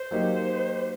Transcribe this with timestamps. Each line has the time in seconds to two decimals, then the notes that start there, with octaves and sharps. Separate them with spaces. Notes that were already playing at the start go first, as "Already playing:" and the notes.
Already playing: C5
0.11 F#3 A#3 D#4 G4